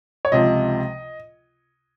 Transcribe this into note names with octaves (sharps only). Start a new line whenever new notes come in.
C#5
C#2 C3 F3 D#5